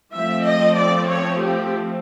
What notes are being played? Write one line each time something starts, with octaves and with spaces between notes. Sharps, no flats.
F3 A3 C4 E5
D#5
D5
C#5
G4